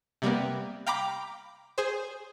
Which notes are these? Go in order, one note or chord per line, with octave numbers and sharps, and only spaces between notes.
C3 G3 A#3 B3
F5 G5 A#5 B5 D6
G#4 C5